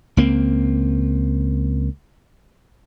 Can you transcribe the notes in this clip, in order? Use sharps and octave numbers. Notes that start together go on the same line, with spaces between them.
C#2 A#3 C4